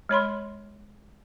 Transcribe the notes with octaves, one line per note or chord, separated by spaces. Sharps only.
G#3 C#5 B5 C6